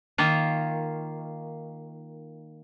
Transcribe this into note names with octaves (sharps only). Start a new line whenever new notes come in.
D#3 A#3 F4